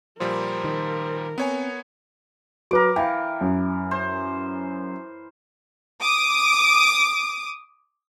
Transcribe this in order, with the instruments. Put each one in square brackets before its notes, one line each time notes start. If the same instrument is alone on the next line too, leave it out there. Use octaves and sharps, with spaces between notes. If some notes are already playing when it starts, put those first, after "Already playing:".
[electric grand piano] A#2 F3 G3 [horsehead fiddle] A#4 [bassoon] C5
[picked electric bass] D#3
[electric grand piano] B3 C#5 G#5 [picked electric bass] C4
[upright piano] F#3 B4 [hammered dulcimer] A#4 D6
[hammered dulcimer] E3 [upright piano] F5 G5
[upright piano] F#2
[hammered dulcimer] C5
[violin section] D6 D#6